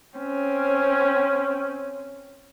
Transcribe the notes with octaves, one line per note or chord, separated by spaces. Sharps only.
C4 C#4